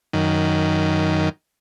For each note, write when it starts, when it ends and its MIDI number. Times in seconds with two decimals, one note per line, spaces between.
0.13 1.29 42
0.13 1.29 51